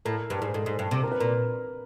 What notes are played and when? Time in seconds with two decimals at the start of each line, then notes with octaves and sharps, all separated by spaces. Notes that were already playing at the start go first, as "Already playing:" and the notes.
0.05 A2 A#4
0.30 G2
0.42 G#2
0.54 G#2 A4
0.66 G#2
0.79 G2
0.91 C3
1.03 A#4
1.11 B4
1.19 A#2 A#4